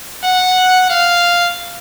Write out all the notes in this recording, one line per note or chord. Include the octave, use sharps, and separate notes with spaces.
F#5
F5